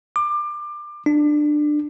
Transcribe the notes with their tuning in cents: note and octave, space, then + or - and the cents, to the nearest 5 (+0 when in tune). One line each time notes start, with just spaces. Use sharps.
D6 +25
D4 +20